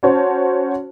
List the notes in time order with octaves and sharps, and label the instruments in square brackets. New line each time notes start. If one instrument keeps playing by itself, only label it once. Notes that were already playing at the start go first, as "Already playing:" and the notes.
[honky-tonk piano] C#4 F#4 C5 C#5 A5